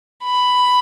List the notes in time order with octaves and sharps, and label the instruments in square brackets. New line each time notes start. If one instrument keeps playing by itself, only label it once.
[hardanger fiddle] B5